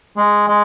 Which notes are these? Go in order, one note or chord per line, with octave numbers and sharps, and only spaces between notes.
G#3
G#3